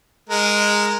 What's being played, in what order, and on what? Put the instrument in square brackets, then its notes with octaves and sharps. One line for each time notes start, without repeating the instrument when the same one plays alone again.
[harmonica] G#3 A#4